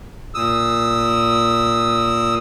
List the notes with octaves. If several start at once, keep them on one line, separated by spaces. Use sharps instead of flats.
A#2 D#6 E6